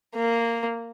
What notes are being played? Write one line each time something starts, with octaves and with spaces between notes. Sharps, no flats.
A#3